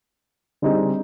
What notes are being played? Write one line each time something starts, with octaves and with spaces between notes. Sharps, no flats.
D3 G3 C4 D#4 G#4